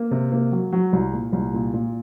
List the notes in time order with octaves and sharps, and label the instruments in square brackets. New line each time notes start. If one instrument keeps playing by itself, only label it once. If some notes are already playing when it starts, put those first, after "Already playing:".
Already playing: [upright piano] A#3
C3
A#3
F#3
F#3
C2
A#2
C2
A#2
A#2